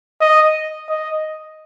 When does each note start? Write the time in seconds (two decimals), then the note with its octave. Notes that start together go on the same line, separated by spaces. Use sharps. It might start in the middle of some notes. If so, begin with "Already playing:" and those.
0.21 D#5
0.89 D#5